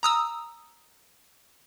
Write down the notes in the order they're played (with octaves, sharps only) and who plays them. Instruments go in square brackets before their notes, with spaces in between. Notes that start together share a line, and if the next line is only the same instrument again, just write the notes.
[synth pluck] A#5 D#6 E6